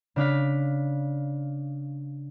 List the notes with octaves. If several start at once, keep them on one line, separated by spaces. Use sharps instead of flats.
C#3 D4 F5 B6